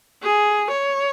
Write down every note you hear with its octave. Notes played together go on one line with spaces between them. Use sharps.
G#4
C#5